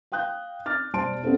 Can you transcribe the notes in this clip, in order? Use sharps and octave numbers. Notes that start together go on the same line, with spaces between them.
F5 G5 D#6 F#6 G6
D6 F6 A6
B2 G3 C5 A5 C6 D7
B3 C#4 G4 A4 C5